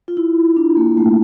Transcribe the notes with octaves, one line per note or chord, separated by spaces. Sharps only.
F4
E4
D4
A#3
A3